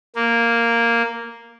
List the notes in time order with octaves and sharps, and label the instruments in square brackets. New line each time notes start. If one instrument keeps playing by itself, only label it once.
[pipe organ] A#3